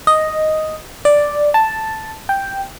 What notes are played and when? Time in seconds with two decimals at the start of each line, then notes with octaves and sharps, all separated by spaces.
0.07 D#5
1.05 D5
1.54 A5
2.29 G5